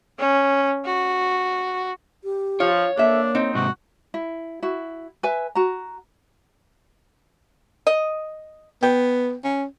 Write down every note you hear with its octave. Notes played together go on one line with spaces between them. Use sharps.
C#4
F#4
G4
F3 F4 C#5
A#3 D4 A4 E5
C4 D#4
G#2 C3 F#4
E4
E4 F#4
B4 E5 G#5
F#4 A#5
D#5
B3 G5
C#4